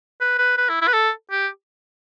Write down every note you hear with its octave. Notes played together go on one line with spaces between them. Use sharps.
B4
B4
B4
E4
E4
B4
A4
G4